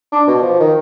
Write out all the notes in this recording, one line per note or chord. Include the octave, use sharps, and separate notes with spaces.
D4
B2
F3
D#3